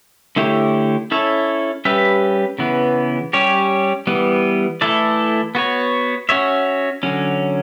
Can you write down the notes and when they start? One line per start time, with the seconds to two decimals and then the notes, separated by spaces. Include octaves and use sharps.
0.36 D3 A3 E4 G4 C#5
1.11 C#4 E4 A4 C#5 E5
1.85 G3 C#4 G4 B4 E5
2.59 C#3 E3 B3
3.33 G3 C#4 G4 C#5
4.07 E3 G3 B3
4.81 E3 A3 E4 A4 D5
5.55 B3 F#4 C#5
6.29 C#4 F#4 C#5 E5
7.03 D3 F#3 C#4